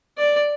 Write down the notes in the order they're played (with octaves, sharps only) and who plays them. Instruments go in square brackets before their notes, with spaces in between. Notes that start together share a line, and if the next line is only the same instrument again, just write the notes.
[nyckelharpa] D5